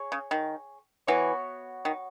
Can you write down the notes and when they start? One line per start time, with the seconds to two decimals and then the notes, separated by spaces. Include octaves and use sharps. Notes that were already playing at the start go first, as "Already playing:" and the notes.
Already playing: G#4 C#5 G#5
0.12 C#3
0.31 D#3
1.07 E3 B3 F#4 C#5
1.85 D#3